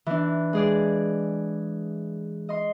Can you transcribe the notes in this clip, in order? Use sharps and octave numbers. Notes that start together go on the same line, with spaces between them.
E3 D4
G#3 G#4 D5
D#5 C6